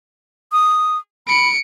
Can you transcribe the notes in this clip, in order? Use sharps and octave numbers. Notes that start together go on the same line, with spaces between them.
D#6
B5 C#7 D7